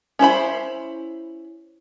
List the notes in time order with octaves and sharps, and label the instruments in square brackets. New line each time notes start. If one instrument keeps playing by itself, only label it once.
[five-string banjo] C#4 E4 C5 B5